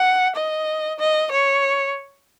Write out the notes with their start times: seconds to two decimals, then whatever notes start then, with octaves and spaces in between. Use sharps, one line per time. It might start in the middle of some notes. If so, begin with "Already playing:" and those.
Already playing: F#5
0.35 D#5
0.99 D#5
1.31 C#5